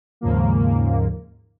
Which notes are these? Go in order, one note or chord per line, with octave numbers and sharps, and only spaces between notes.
D#2 G#2 C#3 F3 A#3